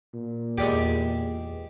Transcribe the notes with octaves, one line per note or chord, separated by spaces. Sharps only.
A#2
E2 G#3 D4 G4